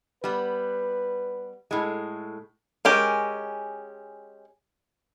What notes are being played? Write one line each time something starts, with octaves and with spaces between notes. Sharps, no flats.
G3 B3 B4
A2 G#3
G#3 C#4 G4 A#4